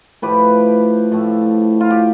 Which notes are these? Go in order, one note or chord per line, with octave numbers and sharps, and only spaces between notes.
A2 F3 A3 G4 B4
A2 F3 A3
F4
G4